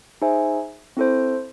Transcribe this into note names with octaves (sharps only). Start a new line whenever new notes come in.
D#4 G#4 C5 E5 G#5
C4 E4 A4 C5